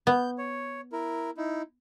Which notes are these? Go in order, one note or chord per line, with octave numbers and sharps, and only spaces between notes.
B3 G6
C#5
E4 A#4
D#4 E4